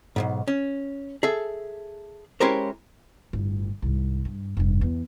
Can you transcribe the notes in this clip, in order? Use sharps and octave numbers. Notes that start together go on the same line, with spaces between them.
B1 F2 G#2
C#4
G#4 A4 E5
G#3 C#4 E4 G4 A#4 C5
G1 A2
C2 G#2
G2
F1 G2
E2